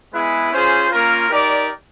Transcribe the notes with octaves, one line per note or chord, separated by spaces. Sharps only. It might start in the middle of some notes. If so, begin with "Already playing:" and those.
G#3 B3 E4 G#4 B4
C#4 F4 G#4 C5
A#3 C#4 F4 A#4
D#4 G4 A#4 D5